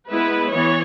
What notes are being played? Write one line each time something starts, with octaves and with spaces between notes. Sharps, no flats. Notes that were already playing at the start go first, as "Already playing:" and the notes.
G#3 B3 E4 B4
E3 B3 C#5